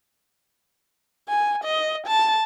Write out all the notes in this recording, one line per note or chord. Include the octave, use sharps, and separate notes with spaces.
G#5
D#5
A5